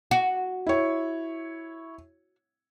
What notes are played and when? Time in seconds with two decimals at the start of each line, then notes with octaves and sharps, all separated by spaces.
0.11 F#4
0.67 E4 C#5